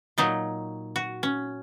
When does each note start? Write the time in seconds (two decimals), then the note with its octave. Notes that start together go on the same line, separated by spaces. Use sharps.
0.18 A#2 F#3 D#4
0.96 F#4
1.23 C#4